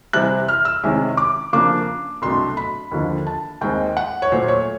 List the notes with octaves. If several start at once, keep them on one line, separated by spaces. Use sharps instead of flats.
C3 E3 G3 C4 E4 F#6
F6
E6
C3 D#3 G#3 C#4 E4
D6
C#3 F3 A#3 D4 D6
C2 B2 F#3 A3 D4 C6
B5
D#2 D3 F3
A5
D#2 D#3 G#3 C4 G5
F#5
C#5
A#2 F#3 A3 C5
C#5